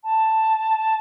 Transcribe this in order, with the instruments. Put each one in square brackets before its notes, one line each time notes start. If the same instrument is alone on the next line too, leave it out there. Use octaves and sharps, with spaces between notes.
[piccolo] A5